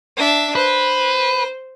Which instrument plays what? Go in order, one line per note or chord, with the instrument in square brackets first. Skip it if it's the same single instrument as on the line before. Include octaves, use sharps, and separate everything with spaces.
[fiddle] D4 E5
[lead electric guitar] B4 [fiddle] C5